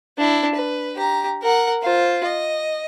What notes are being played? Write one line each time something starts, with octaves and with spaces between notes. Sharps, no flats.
D4 E4
B4
G4 A#5
A#4 F#5
F4 C5
D#5